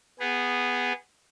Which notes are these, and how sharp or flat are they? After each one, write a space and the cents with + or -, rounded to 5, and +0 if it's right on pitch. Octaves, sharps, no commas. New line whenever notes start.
B3 +0 G#4 -20